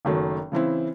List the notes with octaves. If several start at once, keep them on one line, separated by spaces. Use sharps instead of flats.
F#1 D#3 F#3 A3
C#3 E3 C4 E4